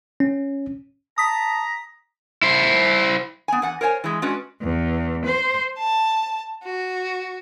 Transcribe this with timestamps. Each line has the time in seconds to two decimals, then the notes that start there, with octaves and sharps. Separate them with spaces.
0.20 C#4
1.18 A5 A#5 D#6 B6
2.42 E4 C5
3.48 B3 G#5
3.62 E2 F#5 G#5
3.81 A#4 C5 C#5 G5 G#5
4.04 E3 G#3
4.22 G#3 C#4 D4 F#4 B4
4.61 E2
5.24 C5
5.78 A5
6.63 F#4